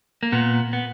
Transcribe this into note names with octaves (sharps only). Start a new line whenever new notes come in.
A#3
A#2 B3
B3